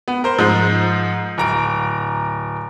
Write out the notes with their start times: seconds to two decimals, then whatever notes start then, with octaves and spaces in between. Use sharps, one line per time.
0.08 B3
0.24 A#4 C5
0.38 G#2 F3 G#3
1.38 D1 A#5 D7